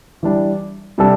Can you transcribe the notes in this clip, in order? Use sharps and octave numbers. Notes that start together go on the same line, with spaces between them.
E3 G3 D4
C3 G3 D4 A4